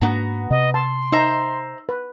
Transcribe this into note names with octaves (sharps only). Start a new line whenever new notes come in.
G#2 A#3 B3 D4 F#4 A#5
C3 D#5
A5 C6
D#4 C5 E5 A#5
B4